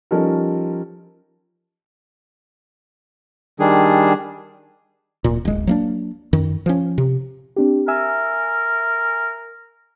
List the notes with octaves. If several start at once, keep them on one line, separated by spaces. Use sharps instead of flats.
F3 G3 C#4 D#4 A4 A#4
D#3 G3 D4 G#4
D1 A#2
D1 G1 G#3
F#3 A#3 D4
F#2 D#3
F3 C#4
C3
C4 D4 G4
A#4 E5 G#5 E6